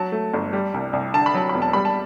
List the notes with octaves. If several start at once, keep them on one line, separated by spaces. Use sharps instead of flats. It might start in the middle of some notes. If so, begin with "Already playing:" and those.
Already playing: F#3 A5
A3
G1
G3
C2
C2
D3 A5
B5
F#3 A5
E1 B5
A5
G3 B5
A5